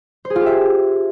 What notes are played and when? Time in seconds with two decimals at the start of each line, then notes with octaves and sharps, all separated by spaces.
0.25 C5
0.30 G#4
0.36 F4
0.41 G4
0.46 E5